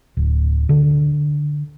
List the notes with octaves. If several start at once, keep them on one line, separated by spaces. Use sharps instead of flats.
D1
D3